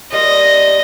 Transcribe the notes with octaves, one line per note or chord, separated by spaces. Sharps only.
G3 A#3 F4 D#5